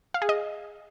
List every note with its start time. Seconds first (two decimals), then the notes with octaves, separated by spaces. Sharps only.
0.14 F5
0.22 G#4
0.29 D#5